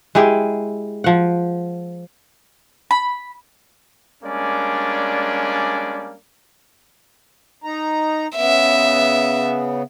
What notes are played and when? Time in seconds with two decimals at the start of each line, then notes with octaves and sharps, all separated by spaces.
0.15 G#3 E4 G4 G#4
1.04 F3 F#5
2.91 B5
4.23 G3 G#3 A#3 C#4 D4 D5
7.64 D#4 A#5
8.36 C#3 B3 E5